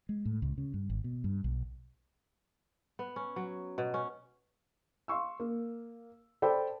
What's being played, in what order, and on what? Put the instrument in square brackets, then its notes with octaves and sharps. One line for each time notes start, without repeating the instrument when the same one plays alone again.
[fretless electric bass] G#3
A2
C#2
C#3
G2
G#1
B2
G2
B1
[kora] B3
C#4
F#3
B2
C#4
[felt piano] F5 C6 C#6 E6
A#3
A4 C5 D5 G5 B5